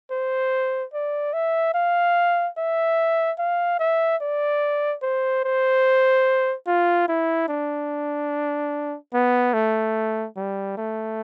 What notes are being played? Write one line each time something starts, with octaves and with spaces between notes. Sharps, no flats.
C5
D5
E5
F5
E5
F5
E5
D5
C5
C5
F4
E4
D4
B3
A3
G3
A3